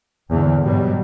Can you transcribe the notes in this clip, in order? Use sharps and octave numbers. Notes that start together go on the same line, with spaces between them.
E2 G#2 D3
G2 B2 F#3 G3